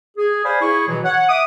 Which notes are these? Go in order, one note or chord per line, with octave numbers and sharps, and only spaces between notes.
G#4
C5 D5 F5 G#5 B5
E4 G#4 C#6
B2 E3 F#3
C#5 F#5
E5 D6 D#6